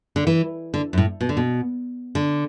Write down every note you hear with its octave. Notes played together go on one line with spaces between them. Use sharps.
D3
E3
D3
F#2
A2
B2
D3
B2
D3